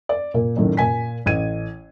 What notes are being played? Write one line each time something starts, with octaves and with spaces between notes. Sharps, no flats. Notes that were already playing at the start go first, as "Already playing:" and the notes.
D5
A#2 A#3
F#1 F#2 A2 D#3
A#2 G#5 B6
A1 G#6 D#7